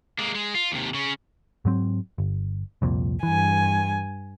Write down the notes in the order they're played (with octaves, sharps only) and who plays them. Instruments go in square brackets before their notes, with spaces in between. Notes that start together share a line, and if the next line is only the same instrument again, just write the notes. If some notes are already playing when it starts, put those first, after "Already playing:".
[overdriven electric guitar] G#3 A#3
G#3
F4
D#2 C3
C#3 C#4
[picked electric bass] G#2 F#3 C4
G1
C2 F2 A#2
[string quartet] G2 G#5 [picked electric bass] E3